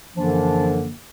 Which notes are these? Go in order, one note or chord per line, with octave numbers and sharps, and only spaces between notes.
F#2 D3 E3 F3 A#3 D4